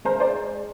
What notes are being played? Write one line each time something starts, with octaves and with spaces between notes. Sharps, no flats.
G#3 A#4 C5
C5 D5